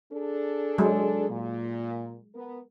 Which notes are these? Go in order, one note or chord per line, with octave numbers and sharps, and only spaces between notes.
D4 G#4 A4
F#3 G#3
A#2
B3 A#4